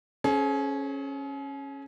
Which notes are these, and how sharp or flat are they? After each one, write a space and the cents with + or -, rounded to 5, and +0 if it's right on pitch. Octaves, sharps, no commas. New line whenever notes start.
C#4 -10 G#4 +40 C5 +0